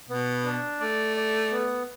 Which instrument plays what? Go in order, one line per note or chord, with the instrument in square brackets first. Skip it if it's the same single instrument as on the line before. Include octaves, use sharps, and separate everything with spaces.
[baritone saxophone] B2 [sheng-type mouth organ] B3
[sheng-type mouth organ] D4
[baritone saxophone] A3 [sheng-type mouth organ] D5
[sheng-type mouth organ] D5
B3